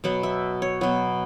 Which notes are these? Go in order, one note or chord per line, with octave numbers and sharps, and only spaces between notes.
B2 F#3 B3 F#5
E5
C#5
B2 F#3 B3